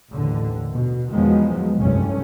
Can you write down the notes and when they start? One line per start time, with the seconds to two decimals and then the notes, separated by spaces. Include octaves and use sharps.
0.10 A1 D#2 D3
0.70 B2
1.11 E2 D#3 F3 F#3 G#3 B3
1.79 F1 C2 G2 A3 C#4